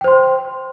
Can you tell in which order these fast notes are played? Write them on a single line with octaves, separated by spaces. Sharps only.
G5 C5 C6